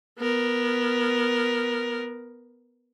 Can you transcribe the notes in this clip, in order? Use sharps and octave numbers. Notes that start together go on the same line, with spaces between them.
B3 A#4